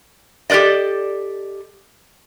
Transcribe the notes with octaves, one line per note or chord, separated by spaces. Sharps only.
G4 A4 B4 D5 D#5